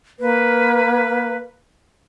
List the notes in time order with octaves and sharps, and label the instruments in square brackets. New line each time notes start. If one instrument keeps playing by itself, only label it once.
[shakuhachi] A#3 [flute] B4